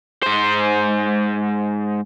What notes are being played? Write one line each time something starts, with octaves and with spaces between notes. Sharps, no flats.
G#2 C5